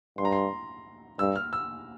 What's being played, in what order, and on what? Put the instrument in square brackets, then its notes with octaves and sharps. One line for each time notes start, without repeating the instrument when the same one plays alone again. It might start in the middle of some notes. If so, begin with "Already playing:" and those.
[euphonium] G2 [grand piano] C6
[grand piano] A#5
C6
[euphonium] G2 [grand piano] E6
[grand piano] F6
E6